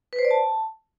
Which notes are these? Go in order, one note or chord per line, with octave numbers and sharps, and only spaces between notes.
B4
C5
D5
A5